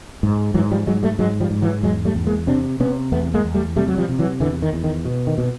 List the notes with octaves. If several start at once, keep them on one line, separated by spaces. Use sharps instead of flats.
G#2
G#2 E3 F#3
F3 G3
G#2 F#3 G#3
G3 A3
G#2 F#3 G#3
F3 G3
G#2
E3 F#3
E2 F#3 G#3
G3 A3
E2
G#3 A#3
C3 C4 D4
C3 B3 C#4
E2 A3 B3
G#3 A#3
E2
G3 A3
C3 G3 A3
F#3
F3 G3
C3
E3 F#3
E2 D3 E3
D#3
E2
D#3
B2
D#3
B2